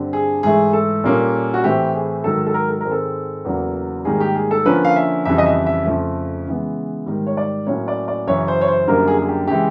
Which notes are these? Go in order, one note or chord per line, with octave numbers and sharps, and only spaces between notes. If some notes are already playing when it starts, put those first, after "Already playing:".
Already playing: G2 D3 G3 C4
G#4
G#2 E3 A3 G#4
A4
A#2 G3 A#3 C#4
F#4
A2 E3 A3 C4 G4
G#4
G#2 D#3 F#3 A4
A4
A#4
A4
G#2 D#3 G#3 C4 A#4
A4
E2 C#3 F#3 A#3
G#2 D#3 G3 A#3 G#4
G4
G#4
A4
D3 F3 A#3 C#4 B4
F5
E5
F2 C#3 E3 G3 E5
D#5
E5
E5
F2 C#3 F3 A3
C#3 E3 G#3 B3
G#2 D#3 G3
C#5
D5
A2 F#3 A#3 C#4 C#5
D5
D5
F#2 C#3 E3 C#5
C5
C#5
C5
F#2 D3 G3 A#3 A#4
G#4
G#4
G4
C#3 E3 G#3 G4